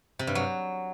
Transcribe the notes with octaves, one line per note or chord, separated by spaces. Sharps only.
C3
G2
F#3